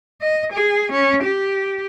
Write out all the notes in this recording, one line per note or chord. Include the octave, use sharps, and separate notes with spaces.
D#5
G#4
C#4
G4